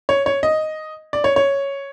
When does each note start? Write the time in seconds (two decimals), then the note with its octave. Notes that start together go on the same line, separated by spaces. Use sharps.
0.09 C#5
0.26 C#5
0.43 D#5
1.13 D5
1.24 C#5
1.36 C#5